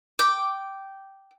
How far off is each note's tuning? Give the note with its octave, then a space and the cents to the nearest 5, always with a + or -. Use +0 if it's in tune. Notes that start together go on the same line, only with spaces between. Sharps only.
G5 -10 D6 +0